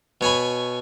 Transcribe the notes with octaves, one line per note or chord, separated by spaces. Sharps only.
B2 C#5 G#5 B5